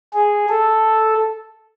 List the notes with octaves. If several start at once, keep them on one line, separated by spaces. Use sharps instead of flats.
G#4
A4